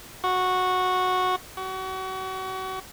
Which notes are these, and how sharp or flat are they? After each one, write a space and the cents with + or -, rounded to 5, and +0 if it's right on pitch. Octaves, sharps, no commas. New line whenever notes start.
F#4 -10
F#4 +30